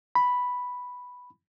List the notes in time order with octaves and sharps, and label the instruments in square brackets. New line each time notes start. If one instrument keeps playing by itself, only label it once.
[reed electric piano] B5